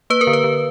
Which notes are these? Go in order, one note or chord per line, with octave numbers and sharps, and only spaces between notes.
A#3 B4
A#4
D3
B4
D3